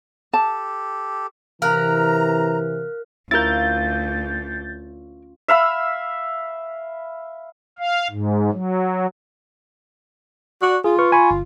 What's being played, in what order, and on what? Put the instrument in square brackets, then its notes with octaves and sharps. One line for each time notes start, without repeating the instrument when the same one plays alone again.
[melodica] G4 A4 [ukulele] A5
[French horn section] C3 E3 [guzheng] A#4 [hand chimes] F5 F6 F#6 [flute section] A#5
[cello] D2 [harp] C#4 F4 [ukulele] E4 A#4 [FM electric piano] G6 A6
[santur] E5 F5 B5 E6
[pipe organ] F5
G#2
F#3
[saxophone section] F#4 D5
[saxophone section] F4 [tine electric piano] G#4
[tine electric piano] B4 C#6 F6
G#5 B5 C#6
G1